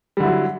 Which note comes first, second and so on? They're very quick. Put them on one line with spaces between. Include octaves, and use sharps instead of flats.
G3 D3 E4 F#3